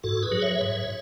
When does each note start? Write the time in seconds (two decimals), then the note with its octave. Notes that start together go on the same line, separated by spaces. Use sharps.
0.04 G#2 F#4 A4
0.23 G#4 B4
0.32 F#3
0.42 C#5 E5
0.61 G#2